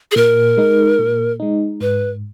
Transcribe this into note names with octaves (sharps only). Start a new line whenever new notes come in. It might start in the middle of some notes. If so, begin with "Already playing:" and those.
G#4
A#2 A#4
G#3 D#4
A#2
G#3 D#4
G#2 B4